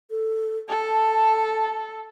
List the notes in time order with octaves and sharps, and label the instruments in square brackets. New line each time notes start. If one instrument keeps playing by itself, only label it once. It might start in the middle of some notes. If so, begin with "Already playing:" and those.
[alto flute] A4
[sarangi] A4 [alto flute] A5